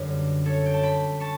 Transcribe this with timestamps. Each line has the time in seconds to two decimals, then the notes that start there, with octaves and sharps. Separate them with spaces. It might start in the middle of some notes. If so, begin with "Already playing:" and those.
Already playing: F#2 D3 G3 G4 B4
0.45 A4 C#5
0.66 G5
0.74 A5
0.83 G5 B5
1.20 A5 C#6